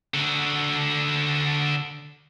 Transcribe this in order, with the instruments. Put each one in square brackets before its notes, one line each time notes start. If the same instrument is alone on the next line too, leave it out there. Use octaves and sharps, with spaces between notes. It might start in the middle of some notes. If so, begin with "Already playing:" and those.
[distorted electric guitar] D3 F#4